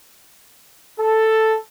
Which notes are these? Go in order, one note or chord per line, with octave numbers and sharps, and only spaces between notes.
A4